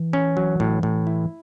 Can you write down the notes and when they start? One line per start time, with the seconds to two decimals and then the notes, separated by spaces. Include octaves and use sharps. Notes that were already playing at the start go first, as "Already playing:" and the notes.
Already playing: E3
0.13 C#4
0.37 F#3
0.60 A2
0.83 A2
1.07 E4